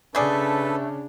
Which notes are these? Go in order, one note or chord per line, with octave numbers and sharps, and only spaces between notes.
C#3 A3 D4 G#4 A4 B4 D5